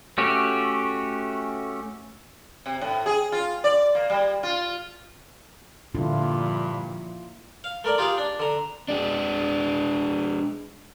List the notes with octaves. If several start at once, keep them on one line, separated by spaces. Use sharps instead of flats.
A3 C#4 F#4 G4
C3
A2
G#4
F4
D5
A#3
G3
F4
G2 A#2 D3 F3 E4 F4
F5
A3 A#4 D5
F4 G4 G#4 F5
D4
D3 A#5
G#3 D4